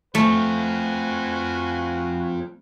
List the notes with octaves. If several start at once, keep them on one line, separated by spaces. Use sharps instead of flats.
F3 A3 C4 F#4 B4 G#5